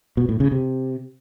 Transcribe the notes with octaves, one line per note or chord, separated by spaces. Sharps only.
B2
A2
C#3
C3